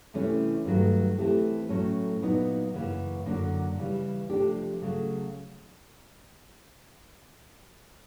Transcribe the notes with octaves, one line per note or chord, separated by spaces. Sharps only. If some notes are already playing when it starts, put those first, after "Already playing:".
C3 E3 A3 C#4 E4
G2 D#3 F#3 A3
E3 A3 C4 E4 G4
A2 F#3 A3 C#4
A#2 F#3 B3 D#4
F#2 C#3 E3 G3 A#3
F#2 D3 F#3 A#3 D4
C#3 E3 G3
C3 F3 A3 D4 G4
C#3 F#3 A3